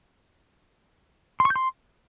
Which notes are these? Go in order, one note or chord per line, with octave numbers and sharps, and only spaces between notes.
C6
C#6
G6
C6